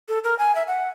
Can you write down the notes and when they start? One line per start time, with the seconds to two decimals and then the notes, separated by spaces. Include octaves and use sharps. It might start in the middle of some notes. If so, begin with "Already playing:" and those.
0.09 A4
0.24 A#4
0.39 G#5
0.55 E5
0.67 F#5